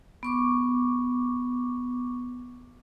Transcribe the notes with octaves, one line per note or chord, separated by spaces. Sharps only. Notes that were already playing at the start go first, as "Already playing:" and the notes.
B3 C#6 D6